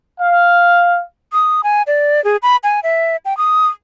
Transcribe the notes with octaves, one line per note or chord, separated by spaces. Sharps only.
F5
D#6
G#5
D5
G#4
B5
G#5
E5
G5
D#6